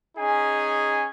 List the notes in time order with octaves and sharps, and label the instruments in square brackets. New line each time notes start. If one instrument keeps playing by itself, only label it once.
[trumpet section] C#4 D#4 G#4 G#5